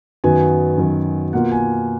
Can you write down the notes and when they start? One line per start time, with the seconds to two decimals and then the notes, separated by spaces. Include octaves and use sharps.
0.24 F#2 D#3 F#3 B3 G#5
0.78 F#2 D#3 F#3 B3
1.33 B2 A#3 F4 F#5
1.52 G#5